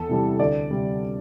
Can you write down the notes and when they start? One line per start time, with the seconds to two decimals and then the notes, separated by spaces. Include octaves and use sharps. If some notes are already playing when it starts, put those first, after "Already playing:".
Already playing: E2 A4
0.09 C3 E3 G3
0.40 D2 D5
0.70 C3 G3